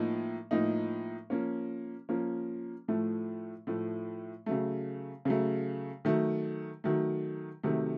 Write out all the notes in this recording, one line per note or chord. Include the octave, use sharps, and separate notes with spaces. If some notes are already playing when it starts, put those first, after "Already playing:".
Already playing: A2 F3 A#3 D#4
A2 F3 A#3 D#4
F3 A#3 C#4
F3 A#3 C#4
A2 F3 A3
A2 F3 A3
C#3 F#3 A3
C#3 F#3 A3
D#3 F#3 A3
D#3 F#3 A3
C3 D#3 F#3 A3